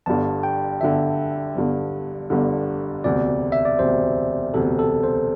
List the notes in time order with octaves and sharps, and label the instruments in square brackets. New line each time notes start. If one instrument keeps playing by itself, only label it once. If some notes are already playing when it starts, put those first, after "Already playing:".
[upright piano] G1 G2 D3 [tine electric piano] A5
[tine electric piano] G5
[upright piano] G1 G2 D3 [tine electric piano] E5
[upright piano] G1 G2 D3
G1 G2 D3
[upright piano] E1 D2 C3 [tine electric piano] D5
[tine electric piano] E5
D5
[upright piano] E1 D2 C3 [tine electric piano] C5
[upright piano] E1 D2 C3 [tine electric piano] A4
[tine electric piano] A4
C5